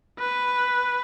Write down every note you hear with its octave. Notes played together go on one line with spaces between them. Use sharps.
B4